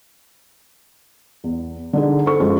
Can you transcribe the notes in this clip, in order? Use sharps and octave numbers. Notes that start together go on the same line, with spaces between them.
E2
D3 D#4 G#4
A4 C5 C#6
F#2 F3 G#3